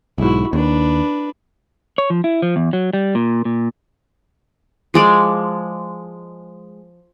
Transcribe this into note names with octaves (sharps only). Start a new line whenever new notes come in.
B1 G#2 E4 F#4
D#2 D4 B4
C#5
F3
E4
F3
E2
F#3
G3
A#2
A#2
F3 G#3 D5